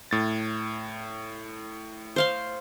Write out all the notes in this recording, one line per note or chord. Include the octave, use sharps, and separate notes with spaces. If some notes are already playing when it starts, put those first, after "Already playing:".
A2 A6
C5 F5 C6